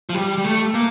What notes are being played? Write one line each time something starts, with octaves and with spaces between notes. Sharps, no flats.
F3
G3
G3
A3
A#3